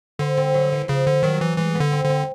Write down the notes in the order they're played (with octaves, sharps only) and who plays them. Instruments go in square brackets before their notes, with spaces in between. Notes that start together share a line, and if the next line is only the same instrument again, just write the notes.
[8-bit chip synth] D3 [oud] C4
[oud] C4
F#3
E3
[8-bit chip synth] C#3 [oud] F3
[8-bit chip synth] D3
[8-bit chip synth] D#3 [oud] F#3
[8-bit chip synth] E3
[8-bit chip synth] E3 [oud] G#3
[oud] B3
[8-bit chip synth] D3
[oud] C4
[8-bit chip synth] D3 [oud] C4